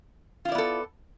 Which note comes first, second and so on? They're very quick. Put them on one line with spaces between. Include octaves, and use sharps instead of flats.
F4 E4 D5 B3 A4